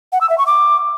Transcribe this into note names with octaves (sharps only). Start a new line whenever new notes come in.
F#5
E6
E5
C#6
D6